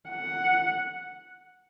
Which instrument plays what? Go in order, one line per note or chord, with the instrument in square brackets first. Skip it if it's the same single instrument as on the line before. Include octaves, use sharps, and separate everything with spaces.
[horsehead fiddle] F#5